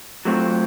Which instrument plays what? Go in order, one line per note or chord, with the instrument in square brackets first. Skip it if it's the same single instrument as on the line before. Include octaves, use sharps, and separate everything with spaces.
[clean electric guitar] F#3 A3 C4 F4